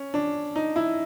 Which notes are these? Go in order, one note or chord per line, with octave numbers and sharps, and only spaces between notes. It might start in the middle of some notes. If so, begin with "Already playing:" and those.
Already playing: C#4
D4
D#4
E4